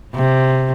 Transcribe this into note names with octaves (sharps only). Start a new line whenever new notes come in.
C3